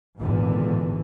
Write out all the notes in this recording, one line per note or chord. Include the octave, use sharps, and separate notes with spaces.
G#1 E2 A#2 D3